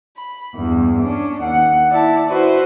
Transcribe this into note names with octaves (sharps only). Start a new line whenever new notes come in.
B5
E2 G2
C#4 D4
D#2 F#5
E4 D5 A5
E4 F#4 B4 C5